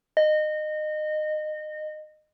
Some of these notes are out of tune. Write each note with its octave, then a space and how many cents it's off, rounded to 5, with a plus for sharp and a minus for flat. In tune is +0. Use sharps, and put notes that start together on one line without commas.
D#5 -25